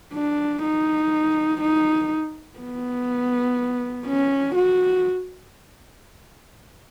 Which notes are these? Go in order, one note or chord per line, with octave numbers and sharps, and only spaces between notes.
D4
D#4
D#4
B3
C#4
F#4